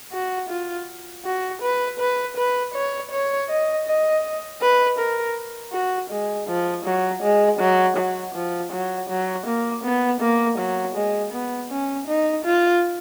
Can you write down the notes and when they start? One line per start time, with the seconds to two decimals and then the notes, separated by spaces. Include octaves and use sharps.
0.12 F#4
0.50 F4
1.25 F#4
1.62 B4
1.99 B4
2.36 B4
2.74 C#5
3.11 C#5
3.49 D#5
3.86 D#5
4.61 B4
4.98 A#4
5.73 F#4
6.10 G#3
6.48 F3
6.85 F#3
7.23 G#3
7.60 F#3
7.97 F#3
8.34 F3
8.72 F#3
9.09 F#3
9.46 A#3
9.84 B3
10.21 A#3
10.58 F#3
10.95 G#3
11.33 B3
11.71 C#4
12.07 D#4
12.45 F4